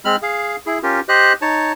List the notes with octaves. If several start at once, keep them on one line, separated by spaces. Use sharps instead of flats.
G#3 C4 B5 F6
G#4 F5
E4 G#4
C#4 F4 G4 A#4
G4 C5 D#5 F#6
D#4 C#5 A5